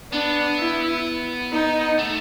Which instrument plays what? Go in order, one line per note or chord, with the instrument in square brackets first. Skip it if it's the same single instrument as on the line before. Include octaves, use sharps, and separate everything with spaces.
[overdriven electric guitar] B3 [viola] D4
[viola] E4
D#4
[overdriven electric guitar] A3